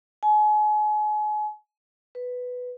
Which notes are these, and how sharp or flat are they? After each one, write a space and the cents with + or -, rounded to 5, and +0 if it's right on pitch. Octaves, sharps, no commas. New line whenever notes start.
G#5 +35
B4 +5